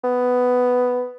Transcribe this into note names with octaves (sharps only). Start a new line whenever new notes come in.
B3